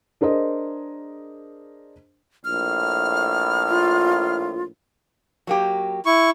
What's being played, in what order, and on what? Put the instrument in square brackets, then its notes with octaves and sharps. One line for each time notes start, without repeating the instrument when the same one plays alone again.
[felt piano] D4 G#4 A#4 C5 D#5
[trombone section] A#1 A2 [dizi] F6
[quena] F4
[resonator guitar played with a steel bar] F#3 A#3 G4
[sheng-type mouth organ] E4 C#6